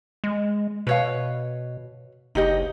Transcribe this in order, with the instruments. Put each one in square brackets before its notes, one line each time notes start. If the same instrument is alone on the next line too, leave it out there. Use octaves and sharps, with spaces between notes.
[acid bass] G#3
[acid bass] B2 [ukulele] B4 C#5 F5
[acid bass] F#1 [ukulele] D#4 G4 D#5